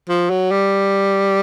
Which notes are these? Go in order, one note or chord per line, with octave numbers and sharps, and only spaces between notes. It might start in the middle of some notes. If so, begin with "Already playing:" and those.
F3
F#3
G3